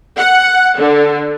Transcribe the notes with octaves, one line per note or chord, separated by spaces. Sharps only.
F#5
D3